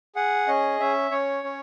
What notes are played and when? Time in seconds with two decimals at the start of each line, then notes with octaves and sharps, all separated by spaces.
0.15 G#4 F#5
0.48 C#4 D#5
0.80 C#4 E5
1.11 C#4 C#5
1.44 C#4